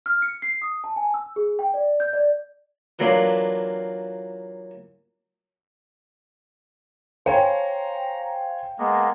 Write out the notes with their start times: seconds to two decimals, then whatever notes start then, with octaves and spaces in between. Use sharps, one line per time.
0.06 F6
0.22 C#7
0.42 C7
0.62 D#6
0.84 A5
0.96 G#5
1.14 E6
1.36 G#4
1.59 G5
1.74 D5
2.00 G6
2.13 D5
2.99 E3 F#3 A#3 D4 F4
7.26 C5 C#5 F5 G5 G#5 A#5
8.78 G#3 A#3 B3